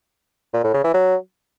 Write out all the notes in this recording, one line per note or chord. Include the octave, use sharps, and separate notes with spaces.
A#2
A2
C#3
E3
F#3